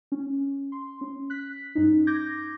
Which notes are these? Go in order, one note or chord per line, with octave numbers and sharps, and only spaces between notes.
C#4
C6
C#4
F#6 B6
G2 C#4 D#4
D6 G6 G#6 A#6